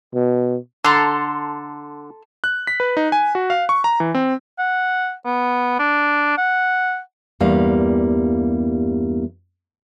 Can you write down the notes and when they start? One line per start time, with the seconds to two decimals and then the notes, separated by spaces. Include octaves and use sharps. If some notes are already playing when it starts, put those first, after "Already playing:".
0.15 B2
0.85 D3 A4 A#5 C6
2.44 F#6
2.67 B6
2.80 B4
2.97 D#4
3.12 G#5
3.35 F#4
3.50 F5
3.69 C#6
3.84 A#5
4.00 E3
4.15 C4
4.59 F#5
5.26 B3
5.79 D4
6.38 F#5
7.41 E2 G2 G3 A#3 F5